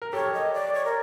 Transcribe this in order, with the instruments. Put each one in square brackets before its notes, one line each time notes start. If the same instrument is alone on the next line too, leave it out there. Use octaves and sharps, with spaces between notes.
[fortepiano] A#4
[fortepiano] G4 A4 [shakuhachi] C#5
[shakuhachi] D#5
D5
C#5
A#4